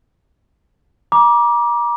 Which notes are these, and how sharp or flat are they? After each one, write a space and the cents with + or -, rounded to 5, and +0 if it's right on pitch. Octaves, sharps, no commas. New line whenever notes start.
A#5 +35 D6 +0